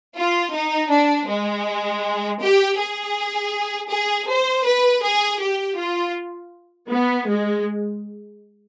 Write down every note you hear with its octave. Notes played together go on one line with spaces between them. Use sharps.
F4
D#4
D4
G#3
G4
G#4
G#4
C5
B4
G#4
G4
F4
B3
G#3